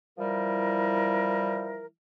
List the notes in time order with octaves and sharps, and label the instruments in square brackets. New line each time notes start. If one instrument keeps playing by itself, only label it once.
[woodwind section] E3 F3 G3 E4 A#4